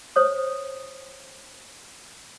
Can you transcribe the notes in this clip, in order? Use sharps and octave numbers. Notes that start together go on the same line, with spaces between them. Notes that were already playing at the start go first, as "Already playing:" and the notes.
C5 C#5 D#6